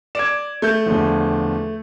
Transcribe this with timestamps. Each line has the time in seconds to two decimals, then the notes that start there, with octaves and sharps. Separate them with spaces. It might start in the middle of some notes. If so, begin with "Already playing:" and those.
0.15 D5 G#6 D7 E7
0.62 A3 G6
0.86 E2 D3 F3